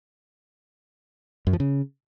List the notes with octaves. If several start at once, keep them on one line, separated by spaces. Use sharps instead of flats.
F#2
F3
C#3